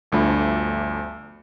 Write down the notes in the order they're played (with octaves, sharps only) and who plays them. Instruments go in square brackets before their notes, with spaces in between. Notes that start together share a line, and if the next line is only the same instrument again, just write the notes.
[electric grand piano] G1 D2 F3 A3 D4 B5